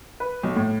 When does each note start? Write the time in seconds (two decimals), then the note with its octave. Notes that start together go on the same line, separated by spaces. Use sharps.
0.20 B4
0.43 B1
0.56 A2